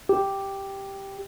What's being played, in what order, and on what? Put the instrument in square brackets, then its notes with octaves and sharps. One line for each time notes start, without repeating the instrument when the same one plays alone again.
[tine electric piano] G4